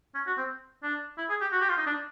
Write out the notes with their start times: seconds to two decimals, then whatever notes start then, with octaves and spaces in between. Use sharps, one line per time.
0.15 C#4
0.27 F#4
0.37 C4
0.83 D4
1.18 E4
1.29 G#4
1.41 G4
1.52 F#4
1.61 G4
1.69 F4
1.78 D#4
1.86 D4